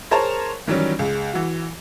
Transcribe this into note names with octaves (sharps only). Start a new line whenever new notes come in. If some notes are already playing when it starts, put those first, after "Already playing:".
G#4 A#4 C5 C#5 A5 A#5
D#3 E3 F#3 G3 C#4
C#2 G#3
E3 F#4